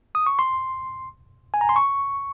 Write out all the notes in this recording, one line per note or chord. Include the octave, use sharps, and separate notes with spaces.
D#6
C#6
C6
G#5
A#5
C6
C#6